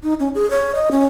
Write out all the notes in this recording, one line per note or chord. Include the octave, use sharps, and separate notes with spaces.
D#4
C#4
G#4
C#5
D#5
C#4